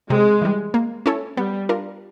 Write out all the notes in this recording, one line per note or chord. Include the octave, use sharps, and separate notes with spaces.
C3 G#3
E3 G3
A#3
C#4 E4 A4 C#5
G3 B3
D4 F4 A#4